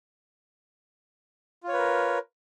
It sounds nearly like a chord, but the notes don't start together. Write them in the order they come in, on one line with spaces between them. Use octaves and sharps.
F4 C#5 B4 A#4